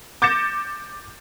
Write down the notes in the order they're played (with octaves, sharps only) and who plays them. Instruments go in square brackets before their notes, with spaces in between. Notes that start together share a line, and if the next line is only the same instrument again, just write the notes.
[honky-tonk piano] D6 G6 A6 A#6 C#7 E7